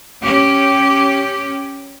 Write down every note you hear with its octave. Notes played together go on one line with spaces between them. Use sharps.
C#4 G4